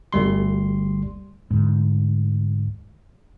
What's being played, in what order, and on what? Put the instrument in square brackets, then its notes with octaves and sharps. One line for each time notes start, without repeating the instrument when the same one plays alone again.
[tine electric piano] G1 D2 G3 C6
[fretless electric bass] D2 G#2